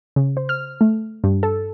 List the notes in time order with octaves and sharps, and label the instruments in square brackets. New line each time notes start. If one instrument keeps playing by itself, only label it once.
[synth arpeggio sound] C#3
C5
F6
A3
G2
A4